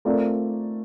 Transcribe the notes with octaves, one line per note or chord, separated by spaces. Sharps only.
A3 C4 F4 A#4 D5